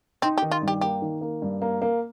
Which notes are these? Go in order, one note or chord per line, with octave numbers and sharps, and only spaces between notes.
C4 D#4
G4
D#3
F4
G2
G4
A#3 G4
D#3
A#3
G2
A#3
A#3